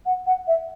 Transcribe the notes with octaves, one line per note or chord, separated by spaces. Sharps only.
F#5
F#5
E5